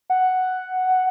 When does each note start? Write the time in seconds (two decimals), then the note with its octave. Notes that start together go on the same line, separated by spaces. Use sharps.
0.10 F#5